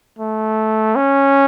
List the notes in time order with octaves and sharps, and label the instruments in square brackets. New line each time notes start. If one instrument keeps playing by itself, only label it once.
[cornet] A3
C#4